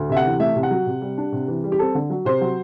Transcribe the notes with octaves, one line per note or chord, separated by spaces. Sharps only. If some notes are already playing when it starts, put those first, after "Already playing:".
Already playing: D2
C3 E5
F#5
E3
A3 E5
C3
F#5
F#3
C3
G3
D4
C3
E3
G3
G4
C4 A4
D3
F#3
C3 C5
F#3